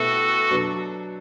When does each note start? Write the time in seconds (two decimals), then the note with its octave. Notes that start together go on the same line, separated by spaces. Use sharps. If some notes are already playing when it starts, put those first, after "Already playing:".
Already playing: B2 A3 E4 F#4 G4 A4 B4
0.51 B2 F#3 B3 D4